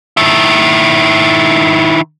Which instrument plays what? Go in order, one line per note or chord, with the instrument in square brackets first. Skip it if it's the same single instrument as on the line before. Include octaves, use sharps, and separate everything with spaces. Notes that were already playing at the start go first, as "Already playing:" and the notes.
[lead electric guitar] D#3 E4